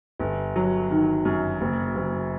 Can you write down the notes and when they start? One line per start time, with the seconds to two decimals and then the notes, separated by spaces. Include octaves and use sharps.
0.20 G1
0.56 F#3
0.90 D#3
1.25 F#2
1.61 F#1
1.96 F#1